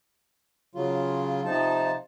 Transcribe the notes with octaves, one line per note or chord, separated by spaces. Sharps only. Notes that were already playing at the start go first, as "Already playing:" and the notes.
C#3 F#3 F4
C3 F3 D#4 A5